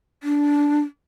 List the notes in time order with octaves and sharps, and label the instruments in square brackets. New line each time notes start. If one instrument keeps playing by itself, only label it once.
[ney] D4